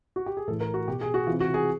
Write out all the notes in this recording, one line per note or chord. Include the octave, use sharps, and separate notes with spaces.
F#4
G4
G#4
A2 E3 A4
A#4
F#4
B2 G4
G#4
F#4
C3 E3 F4
F#4
G#4